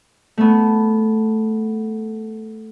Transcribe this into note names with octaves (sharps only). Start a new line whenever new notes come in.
A3 B3